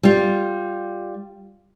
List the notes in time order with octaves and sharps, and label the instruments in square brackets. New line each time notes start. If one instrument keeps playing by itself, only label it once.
[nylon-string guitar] G3 F4